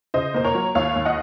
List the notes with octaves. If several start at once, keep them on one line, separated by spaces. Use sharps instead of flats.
C#3 C5 D#5
A#3 C5
A#4 C#5
F#3
D#2 C#5 F5
D#2
D#5 F#5